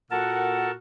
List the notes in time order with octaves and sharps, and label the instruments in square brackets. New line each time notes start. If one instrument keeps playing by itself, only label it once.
[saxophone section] A#2 F#4 [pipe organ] A4 A#4 A5 [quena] F#5